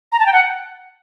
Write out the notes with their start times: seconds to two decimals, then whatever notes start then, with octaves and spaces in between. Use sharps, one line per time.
0.12 A#5
0.19 A5
0.26 G5
0.33 F#5